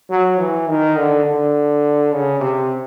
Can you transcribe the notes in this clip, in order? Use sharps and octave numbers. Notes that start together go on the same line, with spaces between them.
F#3
E3
D#3
D3
D3
C#3
C3